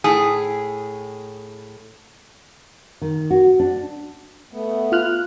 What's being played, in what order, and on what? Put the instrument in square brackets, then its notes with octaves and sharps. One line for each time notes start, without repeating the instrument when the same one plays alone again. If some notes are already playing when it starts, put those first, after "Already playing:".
[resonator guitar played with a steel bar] A2 G#4
[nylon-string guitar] D#3
F#4
D4
[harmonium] A3 B3
[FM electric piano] F4 F6 F#6